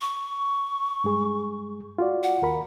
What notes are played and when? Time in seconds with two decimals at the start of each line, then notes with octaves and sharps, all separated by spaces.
0.01 C#6
1.04 G2 G#3 G#4
1.98 F4 F#4 D5
2.23 F#5
2.42 D#2 A#4 B5